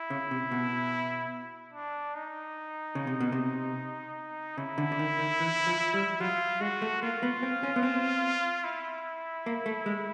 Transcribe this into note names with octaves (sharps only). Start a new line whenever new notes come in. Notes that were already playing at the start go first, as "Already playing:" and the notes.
Already playing: E4
C#3
C3
B2
D4
D#4
C#3
C3
B2
C3
C#3 E4
D3
D3
D#3
D#3
E3
F3
G3
F#3 F4
G#3 F#4
A3
A#3 F4
B3
C4
C#4
B3
C4
E4
A#3
A3
G#3